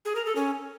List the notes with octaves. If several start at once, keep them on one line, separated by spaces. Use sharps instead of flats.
G#4
A#4
A4
C#4